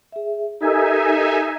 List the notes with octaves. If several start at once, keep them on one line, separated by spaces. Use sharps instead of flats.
G#4 E5
D#4 G4 A4 A#4 E5 G#5